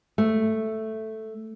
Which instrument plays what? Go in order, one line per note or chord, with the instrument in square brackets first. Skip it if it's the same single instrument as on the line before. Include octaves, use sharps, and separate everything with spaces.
[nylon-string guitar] A3